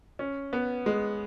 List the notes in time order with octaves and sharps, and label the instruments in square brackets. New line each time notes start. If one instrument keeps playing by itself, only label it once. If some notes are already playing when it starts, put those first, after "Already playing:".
[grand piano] C#4
B3
G#3